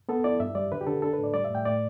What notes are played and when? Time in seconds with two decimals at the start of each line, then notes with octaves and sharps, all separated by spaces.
0.09 B3 A4
0.24 E4 D5
0.40 G2 E5
0.55 G3 D5
0.72 D3 B4
0.81 G4
0.86 D3 A4
1.02 D4 A4
1.13 B4
1.19 A2 D5
1.34 G3 D5
1.44 E5
1.50 A2 G5
1.65 A2 D5